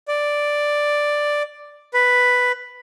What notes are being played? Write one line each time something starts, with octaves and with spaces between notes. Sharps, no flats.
D5
B4